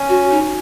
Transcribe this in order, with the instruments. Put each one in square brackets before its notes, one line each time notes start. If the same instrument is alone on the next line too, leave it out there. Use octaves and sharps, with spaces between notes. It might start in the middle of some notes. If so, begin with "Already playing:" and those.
Already playing: [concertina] C#4
[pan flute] F#4
D#4